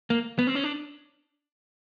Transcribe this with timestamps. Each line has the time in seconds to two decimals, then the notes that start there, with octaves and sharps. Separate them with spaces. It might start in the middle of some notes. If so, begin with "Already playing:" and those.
0.10 A#3
0.39 B3
0.47 C4
0.55 C#4
0.64 D4